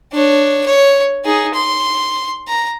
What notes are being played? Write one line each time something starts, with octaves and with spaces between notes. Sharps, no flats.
D4 C#5
C#5
D#4 G#4
C6
A#5